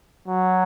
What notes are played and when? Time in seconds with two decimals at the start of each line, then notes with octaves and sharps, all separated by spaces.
0.28 F#3